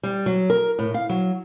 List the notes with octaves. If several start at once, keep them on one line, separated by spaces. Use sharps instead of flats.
G3
F#3
A#4
A2
F5
F#3